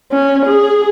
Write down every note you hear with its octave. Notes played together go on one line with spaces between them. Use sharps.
C#4
G#4